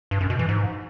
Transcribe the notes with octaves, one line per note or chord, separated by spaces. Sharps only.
G2
F#2
B2
E3
G#2